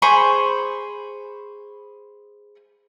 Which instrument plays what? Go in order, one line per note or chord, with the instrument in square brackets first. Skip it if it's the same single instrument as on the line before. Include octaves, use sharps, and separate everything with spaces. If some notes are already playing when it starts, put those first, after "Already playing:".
[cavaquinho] G#4 C5 B5 C#6